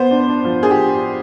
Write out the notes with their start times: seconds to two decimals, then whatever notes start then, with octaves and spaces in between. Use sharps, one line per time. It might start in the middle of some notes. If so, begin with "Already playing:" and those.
Already playing: B3 C5
0.11 D4
0.28 D4
0.45 F3
0.62 D4 G#4
0.71 G4